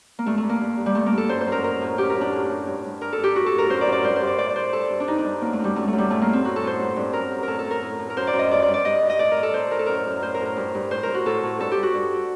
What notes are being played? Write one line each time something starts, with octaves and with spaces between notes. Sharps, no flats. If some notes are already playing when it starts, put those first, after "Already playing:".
A#3
G2 A3
A3
G2
A#3
G2
G2
G3
G2 A3
A#3
G2 A4
F#2 C5
C5
F#2
A#4
A2 A#4
A2
F#2 G4
A#4
F#2
D4
A2
A2
G2
G2
G2 A#4
A4
G2
G4
A2 F#4
A4
A2
A#4
F#2 C5
D5
F#2
D5
G2 C5
C5
G2
D5
A2 D5
D5
A2 C5
G2 A4
G2
D4
G2 D#4
D4
G2
F#2 A#3
A3
F#2
G3
F#2 A3
A3
F#2
G3
A2 A3
A#3
A2
C4
A2 F#4
A4
A2
C5
G2
G2
F#2 A#4
F#2
A2 A4 A#4
A4
A2
A#4
A2
A2
A#4
F#2 C5
D5
F#2
D#5
G2 D5
D5
G2
D5
G2 D#5
G2
D#5
A2 D5
A#4
A2
A4
A2 C5
A2 A#4
A4
F#2 A#4
F#2
A2 C5
A#4
A2
A#4
G2
G2
A2 C5
A#4
A2
F#4
A2 A4
A2
G2 A4
G4
G2
F#4
G2